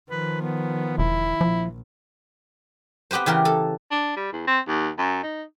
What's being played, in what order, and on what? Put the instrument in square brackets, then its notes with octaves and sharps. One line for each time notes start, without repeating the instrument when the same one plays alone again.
[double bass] D#3 F3 [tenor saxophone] B4
[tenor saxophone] B3
[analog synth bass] E1 [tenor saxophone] E4
[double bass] A#1 [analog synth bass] F3
[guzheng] B3 C4 G4 B4 C5
C#3 E3 G4 A#4
A4
[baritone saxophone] D4
G3
E2
C4
D#2
F#2
D#4